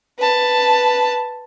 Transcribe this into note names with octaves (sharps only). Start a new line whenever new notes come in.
B4 A5